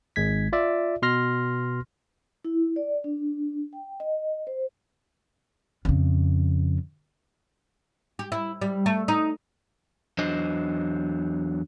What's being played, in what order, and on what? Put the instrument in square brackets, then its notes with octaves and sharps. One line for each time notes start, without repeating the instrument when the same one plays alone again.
[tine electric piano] G#1 G#3 G#6 B6
F4 D5 E5
B2 C6 F6 A#6
[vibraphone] E4
D5
D4
G5
D#5
C5
[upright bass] F2 C#3
[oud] G4
E4
G3
A3
D#4
[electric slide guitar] E2 F#3 D4 C5 D#5